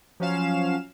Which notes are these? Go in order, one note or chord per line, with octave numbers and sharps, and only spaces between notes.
F3 F#3 C#4 F5 E7